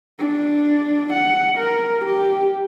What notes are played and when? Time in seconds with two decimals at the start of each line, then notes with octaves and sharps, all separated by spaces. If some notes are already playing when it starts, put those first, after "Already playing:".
0.19 D4
1.13 F#5
1.58 A#4
2.05 G4